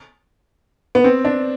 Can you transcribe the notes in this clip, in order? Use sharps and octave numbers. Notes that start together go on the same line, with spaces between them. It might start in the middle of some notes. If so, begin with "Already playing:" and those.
B3
C4
D4